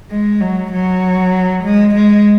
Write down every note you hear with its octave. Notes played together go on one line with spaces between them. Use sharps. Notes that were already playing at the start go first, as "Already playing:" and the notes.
G#3
F#3
F#3
G#3
G#3